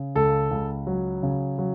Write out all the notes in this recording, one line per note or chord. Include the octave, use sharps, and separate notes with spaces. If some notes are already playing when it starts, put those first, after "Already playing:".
Already playing: C#3
C#2 A4
C#2
F#3
C#3
F#3